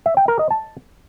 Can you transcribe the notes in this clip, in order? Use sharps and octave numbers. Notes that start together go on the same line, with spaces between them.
E5
G5
A#4
D#5
A5